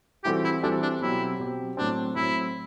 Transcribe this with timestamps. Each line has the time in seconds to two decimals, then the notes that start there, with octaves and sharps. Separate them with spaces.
0.24 E3 G3 C4 F#4 G4 A4
0.44 E4
0.63 E3 G3 C4 D4 F#4 A4
0.82 D4
1.01 B2 F#3 C4 E4 G4
1.39 B2 F#3 C4 G4
1.77 A2 F#3 C4 D4
2.15 A2 F#3 C4 E4